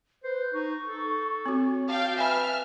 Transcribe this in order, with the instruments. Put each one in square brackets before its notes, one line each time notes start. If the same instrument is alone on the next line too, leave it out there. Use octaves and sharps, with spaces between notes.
[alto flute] B4 [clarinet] C5
[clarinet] D#4 [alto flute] C#6
[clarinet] A4
[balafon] C4 F#4 [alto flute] C#5
[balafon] F#4 [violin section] F5 G5 [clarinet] A5
[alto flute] B4 [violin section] E5 F6 [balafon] G#5 B5